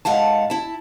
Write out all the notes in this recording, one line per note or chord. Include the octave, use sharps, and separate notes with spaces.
G#2 F5 F#5 A5
E4 A5